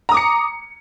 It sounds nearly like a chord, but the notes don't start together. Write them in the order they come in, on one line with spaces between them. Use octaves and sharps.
A#5 D#6 D6 C#7